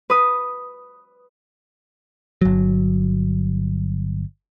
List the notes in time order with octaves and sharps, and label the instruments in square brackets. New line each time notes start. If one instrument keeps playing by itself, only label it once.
[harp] B4 D#6
[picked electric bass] G1 F#3